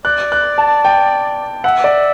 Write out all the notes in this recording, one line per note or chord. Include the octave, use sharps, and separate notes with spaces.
D5 F#6
F#6
A5
G5
E5 F#5
D5